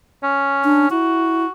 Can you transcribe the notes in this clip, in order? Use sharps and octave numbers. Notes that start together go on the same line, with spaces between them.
C#4
D4
E4 F#4